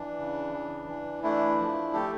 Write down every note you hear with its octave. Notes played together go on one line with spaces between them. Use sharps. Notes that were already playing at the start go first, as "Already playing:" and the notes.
Already playing: E3 D4
C#3
E3
E3
A3 D4 E4
F3
A3 G4 A4